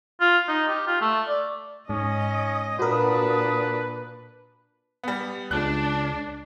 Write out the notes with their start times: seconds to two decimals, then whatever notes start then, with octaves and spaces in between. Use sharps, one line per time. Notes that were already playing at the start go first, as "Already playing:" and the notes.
0.21 F4
0.48 D#4
0.68 G4
0.87 F4
1.01 A3
1.28 D5
1.89 G#2 C#4 D#5 D#6
2.79 A#2 D4 F#4 A#4 B4
5.04 G3 B3
5.51 C#2 D4 F#6